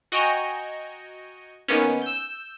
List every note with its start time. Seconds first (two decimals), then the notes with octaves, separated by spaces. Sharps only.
0.12 F#4 D#5 G5 G#5 A#5 C#6
1.68 D#3 A#3 B3 C#4
2.02 E6 G6